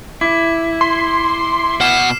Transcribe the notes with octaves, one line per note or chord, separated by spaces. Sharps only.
E4 D6
C6
B2 F#5 F6 C7 E7